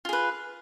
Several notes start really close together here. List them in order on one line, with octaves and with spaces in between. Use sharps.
F4 G#4 B4